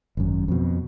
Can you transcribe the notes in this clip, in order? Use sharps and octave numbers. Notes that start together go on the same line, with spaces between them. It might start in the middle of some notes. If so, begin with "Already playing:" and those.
G#1 F#2
F2 B2